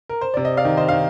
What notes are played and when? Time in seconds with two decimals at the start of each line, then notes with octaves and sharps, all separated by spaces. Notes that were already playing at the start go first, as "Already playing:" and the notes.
0.09 A#4
0.21 C5
0.34 C3 D5
0.45 D#5
0.57 D5 F5
0.65 D#3
0.77 C5 D#5
0.89 D#3 F5